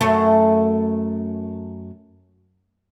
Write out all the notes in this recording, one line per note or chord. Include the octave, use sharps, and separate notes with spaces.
F#2 A3